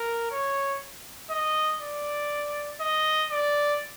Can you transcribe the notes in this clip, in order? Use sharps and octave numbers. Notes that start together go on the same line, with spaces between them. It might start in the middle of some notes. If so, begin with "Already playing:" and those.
Already playing: A#4
C#5
D#5
D5
D#5
D5